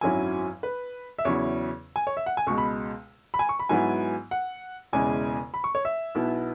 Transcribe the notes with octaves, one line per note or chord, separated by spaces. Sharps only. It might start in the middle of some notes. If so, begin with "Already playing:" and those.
G#1 F#2 F#3 C#4 E4 G#5
B4
E5
E2 C#3 F#3 E4 C#5
G#5
C#5
E5
F#5
G#5
C#2 B2 G#3 C#6
B5
B5
G#5
C#6
B5
G#2 F#3 B3 E4 G#5
F#5
E1 E2 C#3 G#3 E4 G#5
B5
C#6
C#5
E5
B1 B2 B3 E4